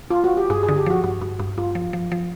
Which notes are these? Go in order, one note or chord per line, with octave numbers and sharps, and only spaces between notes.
F4
F#4
G4
G2 G#4
G#4
D3
G4
F3 F#4
G2
G2
G2
G2 F4
F3
F3
F3